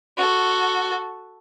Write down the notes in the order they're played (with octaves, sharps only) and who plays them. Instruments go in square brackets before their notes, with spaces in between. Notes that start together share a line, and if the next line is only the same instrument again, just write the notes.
[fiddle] F#4 A4